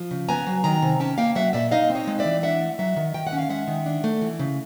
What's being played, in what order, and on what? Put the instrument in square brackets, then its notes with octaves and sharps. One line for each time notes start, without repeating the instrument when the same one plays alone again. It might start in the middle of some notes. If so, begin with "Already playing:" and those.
Already playing: [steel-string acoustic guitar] F3
C#3
B3 G#5 A#5
F#3
D#3 G#5 A#5
C3
C#4 G5 A5
A#3 F5 G5
F#3 E5 F#5
A#2 D5 E5
D#4 D#5 F5
C4
C#5 D#5
G#3
D5 E5
E3
D4 E5 F#5
A3
F#3 E5 F#5
D#3
D#3 G5
F#5
C#4
F5
G#3 E5 F#5
D#3
D4
A3
E3
C#3